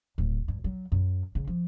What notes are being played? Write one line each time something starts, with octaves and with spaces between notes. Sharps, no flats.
D1
G2
F#3
F#2
C#3
F3